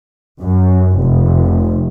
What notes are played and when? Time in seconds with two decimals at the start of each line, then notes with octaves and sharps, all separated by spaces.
0.41 F#2
1.00 F1